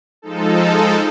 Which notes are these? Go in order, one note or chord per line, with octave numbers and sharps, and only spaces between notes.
F3 G#3 D#4 A4